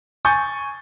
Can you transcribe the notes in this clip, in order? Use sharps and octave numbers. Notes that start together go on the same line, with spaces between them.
G#5 C#6 G6 A6